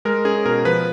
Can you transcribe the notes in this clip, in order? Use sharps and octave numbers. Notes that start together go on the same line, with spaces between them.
G#3 A#4
C#4 G#4
B2 A#4
F3 B4